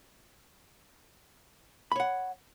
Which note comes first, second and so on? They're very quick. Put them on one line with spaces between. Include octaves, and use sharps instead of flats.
B5 C#5 F#5